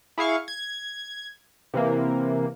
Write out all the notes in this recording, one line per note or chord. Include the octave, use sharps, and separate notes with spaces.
E4 G#4 F5 C#6
G#6
C3 E3 A#3